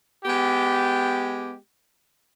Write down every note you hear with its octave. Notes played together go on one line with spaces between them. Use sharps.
G#3 B3 G4